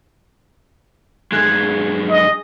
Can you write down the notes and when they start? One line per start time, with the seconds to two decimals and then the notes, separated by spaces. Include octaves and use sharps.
1.32 G2 G#3 G#4 F#6 G#6
2.10 D#5